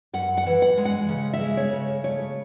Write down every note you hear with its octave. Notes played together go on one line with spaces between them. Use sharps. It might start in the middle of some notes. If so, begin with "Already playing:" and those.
F#2 F#5
F#5
E3
F#5
G#3
F#5
C#3
E5
G#3
C#5
C#3
A3 C#5